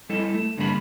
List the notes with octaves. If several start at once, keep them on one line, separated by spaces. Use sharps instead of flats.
G3 E4 A4 D#5
A3
G2 D3 G3 A#3 B4 B5